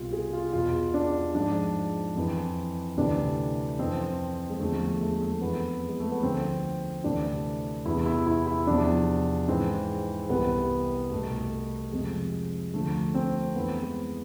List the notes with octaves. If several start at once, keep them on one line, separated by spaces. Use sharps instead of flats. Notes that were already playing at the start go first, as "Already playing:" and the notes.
Already playing: C2 B2 F4
G#4
F4
E2 B2 F4
D4
G#2 F3 D4
F2 E3
D2 C3 E3 D4
F2 E3 C4
G#3
E2 D3 F3 A3
A3
G#3
A3
F2 E3 B3
G#3
A3
B3
D2 D3 F3 C4
D2 C3 E3 D4
E2 C3 E3 E4
E4
E4
E4
E2 C3 F3 D4
G#2 E3 C4
C2 C3 E3 B3
C2 B2 A3
F2 C3 F3 G#3
D2 D3 F3 A3
C4
F2 E3 B3
G#3